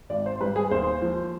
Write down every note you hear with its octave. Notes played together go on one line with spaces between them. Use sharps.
G#1 D5
C5
G3 B4
G#4
D#2 C5
F3